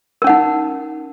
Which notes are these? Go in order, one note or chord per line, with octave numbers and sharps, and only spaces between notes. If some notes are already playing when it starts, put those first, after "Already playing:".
C#4 D#4 A#4 F#5